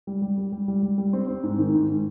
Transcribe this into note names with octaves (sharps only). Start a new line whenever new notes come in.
G3
G3
G3
G3
G3
G3
G3
C4
C4
G#2
D#3
G#2